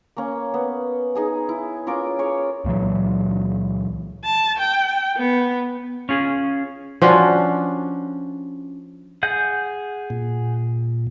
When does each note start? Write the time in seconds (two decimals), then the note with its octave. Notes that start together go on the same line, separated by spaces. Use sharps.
0.17 A#3 C#4
0.54 B3
1.15 D#4 G#4 G#5
1.49 E4
1.87 C#4 F4 A#4 D6
2.19 G#4 C#5
2.64 C#2 A#2 E3 F#3
4.24 A5
4.58 G5
5.17 B3
6.09 C#4 F4 G#4
7.02 F3 C#4 D4 F#4
9.23 G#4 F#5 G6
10.10 A#2